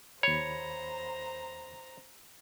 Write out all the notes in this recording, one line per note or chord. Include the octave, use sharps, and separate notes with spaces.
D#2 C5 C#5 A#5 B5